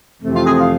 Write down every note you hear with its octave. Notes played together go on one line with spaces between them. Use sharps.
F2 C3 E3 A3 C4
F4
G#4
F5